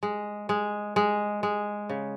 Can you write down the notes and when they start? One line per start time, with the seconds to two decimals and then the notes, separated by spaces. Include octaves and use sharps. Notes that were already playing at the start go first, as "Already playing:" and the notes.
0.03 G#3
0.49 G#3
0.96 G#3
1.43 G#3
1.89 C#3